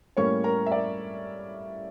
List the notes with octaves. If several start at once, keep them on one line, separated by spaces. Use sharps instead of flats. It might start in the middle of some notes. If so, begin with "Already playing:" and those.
A2 G3 A#3 C#4 C#5 C#6
A#4 A#5
E5
D5